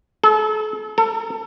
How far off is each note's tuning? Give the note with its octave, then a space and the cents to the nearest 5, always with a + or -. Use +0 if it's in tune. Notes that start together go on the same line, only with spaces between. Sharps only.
A4 -40
A4 +25